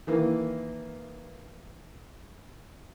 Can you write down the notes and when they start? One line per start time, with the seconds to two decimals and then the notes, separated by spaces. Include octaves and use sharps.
0.07 D#3 E3 A#3